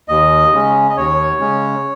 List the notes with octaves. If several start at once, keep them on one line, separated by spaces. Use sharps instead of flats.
D#2 D#5
C#3 G#3 C#4
D#5
D#2 C#5
C#3 G#3 C#4